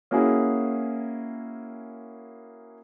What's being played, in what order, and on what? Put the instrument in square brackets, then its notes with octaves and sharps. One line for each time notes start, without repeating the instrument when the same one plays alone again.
[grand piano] A#3 C#4 E4 F#4 G#4